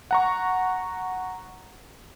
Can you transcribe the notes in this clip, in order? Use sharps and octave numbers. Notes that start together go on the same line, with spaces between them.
F#5 A#5 C#6